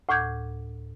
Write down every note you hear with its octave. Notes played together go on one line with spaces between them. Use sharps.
D2 A2 D6 G6 G#6